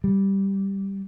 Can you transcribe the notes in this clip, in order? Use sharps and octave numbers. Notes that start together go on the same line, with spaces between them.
G3